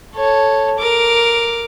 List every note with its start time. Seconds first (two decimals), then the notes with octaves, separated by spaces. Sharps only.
0.15 A4 C#5
0.78 A#4 D6